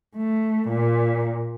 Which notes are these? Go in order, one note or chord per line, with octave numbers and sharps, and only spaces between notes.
A3
A#2